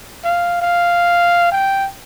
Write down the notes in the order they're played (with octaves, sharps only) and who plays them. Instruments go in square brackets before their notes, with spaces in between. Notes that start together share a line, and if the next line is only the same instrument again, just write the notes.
[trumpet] F5
F5
G5